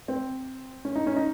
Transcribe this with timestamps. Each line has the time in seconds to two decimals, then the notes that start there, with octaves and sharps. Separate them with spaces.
0.08 C4
0.85 C#4
0.96 D#4
1.07 C#4
1.16 D#4